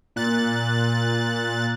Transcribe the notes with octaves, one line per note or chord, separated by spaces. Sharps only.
A#2 F#6 A6